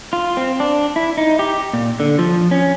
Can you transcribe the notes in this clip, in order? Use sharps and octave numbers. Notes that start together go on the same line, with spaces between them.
F4
C4
D4
E4
D#4
G4
A#2
D3
F3
C#4